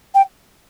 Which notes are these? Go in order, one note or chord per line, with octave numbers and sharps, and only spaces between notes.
G5